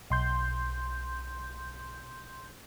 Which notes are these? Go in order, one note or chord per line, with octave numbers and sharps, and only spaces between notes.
B1 C6 G6